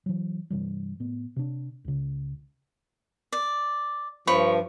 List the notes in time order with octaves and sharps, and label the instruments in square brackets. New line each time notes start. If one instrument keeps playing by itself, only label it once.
[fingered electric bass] E3 F#3
G2 C3 E3 G3
A2 B3
C3 D4
C#2 C#3
[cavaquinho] D5
[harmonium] G2 [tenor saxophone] F3 [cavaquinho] C#5 B5